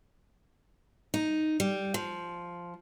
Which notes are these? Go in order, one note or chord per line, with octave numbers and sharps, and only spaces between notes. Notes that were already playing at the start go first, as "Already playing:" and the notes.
D#4
G3
F3